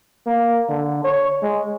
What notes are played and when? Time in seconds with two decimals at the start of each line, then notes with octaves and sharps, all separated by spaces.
0.26 A#3
0.69 D3
1.04 C#5
1.42 G#3